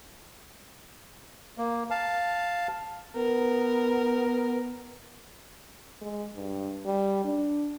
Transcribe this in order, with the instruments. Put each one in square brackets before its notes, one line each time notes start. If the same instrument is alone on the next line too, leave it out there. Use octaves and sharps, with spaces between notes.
[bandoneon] A#3
F5 A5
[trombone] B3 [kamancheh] A#4
[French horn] G#3
G2
G3
D4